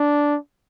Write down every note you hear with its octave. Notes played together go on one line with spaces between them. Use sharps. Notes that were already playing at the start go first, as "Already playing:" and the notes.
Already playing: D4